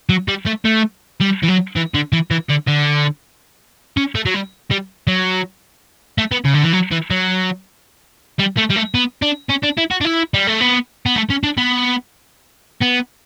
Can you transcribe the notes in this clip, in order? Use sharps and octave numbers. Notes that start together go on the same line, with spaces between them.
F#3
G3
A3
A3
G3
E3
F#3
E3
D3
E3
E3
D3
D3
C#4
A3
F#3
G3
G3
F#3
A3
B3
C#3
D3
E3
F#3
E3
F#3
G3
A3
G3
A3
B3
D4
C#4
D4
E4
F#4
D4
E4
G3
A3
B3
B3
A3
C#4
D4
B3
B3